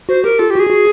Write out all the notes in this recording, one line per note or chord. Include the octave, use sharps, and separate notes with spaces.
F#4 C5
G4 A#4
F4 A4
G4
F#4 G#4
F#4